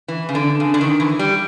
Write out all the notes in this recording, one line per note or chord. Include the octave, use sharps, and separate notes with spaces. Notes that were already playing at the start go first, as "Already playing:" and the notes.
E3
C#3
D3
C#3
D3
D#3
E3
G3